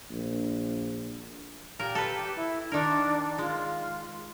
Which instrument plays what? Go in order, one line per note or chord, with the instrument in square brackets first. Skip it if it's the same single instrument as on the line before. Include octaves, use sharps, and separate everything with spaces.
[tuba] A#1
[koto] A#2 A#4 [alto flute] G4
[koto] A4 B4
[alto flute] E4
[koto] D#3 A#4 [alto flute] D4
[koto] G#3 [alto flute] F4